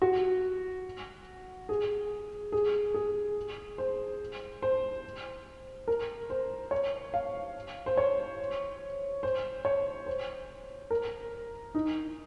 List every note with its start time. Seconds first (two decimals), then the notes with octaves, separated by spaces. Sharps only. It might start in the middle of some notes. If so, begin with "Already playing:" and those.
0.02 F#4
1.69 G#4
2.52 G#4
2.94 G#4
3.78 C5
4.62 C5
5.88 A#4
6.30 C5
6.71 C#5
7.14 F5
7.86 C5
7.97 C#5
9.23 C5
9.65 C#5
10.06 C5
10.90 A#4
11.75 D#4